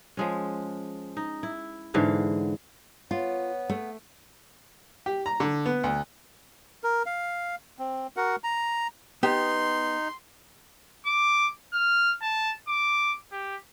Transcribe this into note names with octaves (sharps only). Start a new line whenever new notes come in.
F3 G#3 C#4
D#4
E4
G#2 D3 E3 F5
B3 F4 C#5
A3
G4
A#5
D3
B3
D2
A#4
F5
C4
F#4 A#4 F#5
A#5
B3 D#4 G4 C6
D6
F6
A5
D6
G4